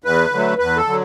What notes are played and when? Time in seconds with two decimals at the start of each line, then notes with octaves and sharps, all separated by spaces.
0.04 E2 B4
0.31 D3 F#3 A3
0.58 E2 B4
0.77 A4
0.86 D3 F#3